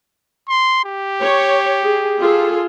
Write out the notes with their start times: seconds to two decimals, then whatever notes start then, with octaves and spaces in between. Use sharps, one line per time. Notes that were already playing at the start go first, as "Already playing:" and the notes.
0.49 C6
0.84 G4
1.21 C#5
1.84 G#4
2.20 F4 G#4 A4